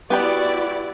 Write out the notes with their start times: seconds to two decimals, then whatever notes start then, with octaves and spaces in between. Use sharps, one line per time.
0.10 B3 E4 F#4 G4 D5 B5